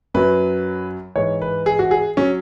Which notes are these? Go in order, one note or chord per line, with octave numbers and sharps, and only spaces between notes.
F#2 F#3 B4
G#2 E3 C#5
B4
G#4
F#4
G#4
F#3 C#4